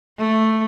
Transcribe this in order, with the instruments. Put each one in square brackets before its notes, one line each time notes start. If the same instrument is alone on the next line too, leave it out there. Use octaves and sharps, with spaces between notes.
[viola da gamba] A3